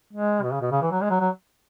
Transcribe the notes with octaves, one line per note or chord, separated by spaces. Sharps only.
G#3
B2
C#3
B2
C#3
E3
F#3
G#3
F#3
F#3